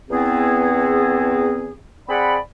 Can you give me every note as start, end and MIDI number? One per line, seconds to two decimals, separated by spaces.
0.09 1.73 40
0.09 1.73 59
0.09 1.73 60
0.09 1.73 68
2.08 2.37 60
2.08 2.37 68
2.08 2.37 74
2.08 2.37 78
2.08 2.37 83